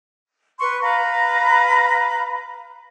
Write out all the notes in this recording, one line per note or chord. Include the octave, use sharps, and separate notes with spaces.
B4 C6 C#6
B4 F5 A#5 B5